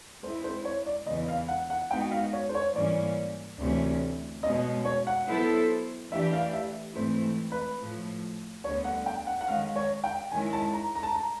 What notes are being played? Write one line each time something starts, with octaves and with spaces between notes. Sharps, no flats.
G#3 C4 E4 C5
C5
C#5
D5
E2 C#3 E3 G#3 D#5
F5
F#5
F#5
G#3 B3 D#4 F#4 G5
F5
C#5
C5
C#5
G#2 E3 G3 A#3 C#4 D5
D2 C3 E3 A3 C#4
B2 G#3 C#4 D#5
C#5
F#5
F#3 B3 E4 A4 C5
E3 A3 D4 G4 E5
F5
E5
G#2 E3 A3 C4 E4 C5
B4
A2 F3 A3
D2 D3 G3 B3 C#5
F#5
G5
F#5
F#5
D#3 G#3 C#4 F5
C#5
G5
D#3 G#3 C#4 E4 G#5
A5
A#5
A#5
A5
A#5